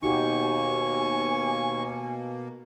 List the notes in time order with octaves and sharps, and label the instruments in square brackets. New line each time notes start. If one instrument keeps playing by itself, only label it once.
[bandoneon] D#2 C#6 [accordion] B2 A#3 [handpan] D#4 F#4 G4 [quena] G#5